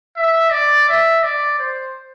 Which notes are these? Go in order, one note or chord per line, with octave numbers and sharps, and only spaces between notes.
E5
D5
E5
D5
C5